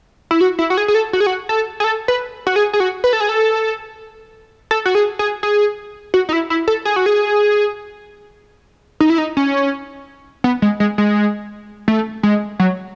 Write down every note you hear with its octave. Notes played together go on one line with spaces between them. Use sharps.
E4
F#4
E4
F#4
G#4
G#4
A4
F#4
G#4
F#4
A4
G#4
A4
B4
F#4
G#4
G#4
F#4
B4
A4
G#4
A4
A4
F#4
G#4
G#4
G#4
F#4
D#4
E4
E4
A4
G#4
F#4
G#4
D#4
E4
D#4
C#4
B3
G#3
G#3
G#3
A3
G#3
F#3